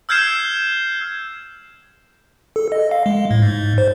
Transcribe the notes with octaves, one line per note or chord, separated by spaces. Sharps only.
E6 F6 G6 G#6 C7 E7
A4
D#5
F5
G#3
A2
G#2
C5